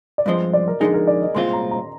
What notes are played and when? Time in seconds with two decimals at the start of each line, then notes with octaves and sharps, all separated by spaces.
0.18 D5
0.26 G2 F3 G#3 C4 D#5
0.53 D5
0.68 A#4
0.80 F2 D3 G#3 D#4 G#4
0.94 A#4
1.07 D5
1.22 D#5
1.35 C2 A#2 G#3 C4 F4 C6
1.53 A#5
1.71 A#5